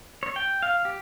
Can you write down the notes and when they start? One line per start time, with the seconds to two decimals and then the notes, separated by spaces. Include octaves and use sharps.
0.23 C#5
0.36 G5
0.63 F5
0.85 G4